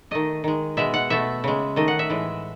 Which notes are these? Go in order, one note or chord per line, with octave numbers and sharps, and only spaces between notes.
D#3 A3 D#5
D#3 G#3
B2 G#3 E5
F#5
B2 A3 E5
C#3 G#3
D#3 A3 D#5
F#5
E5
A2 E3 G#3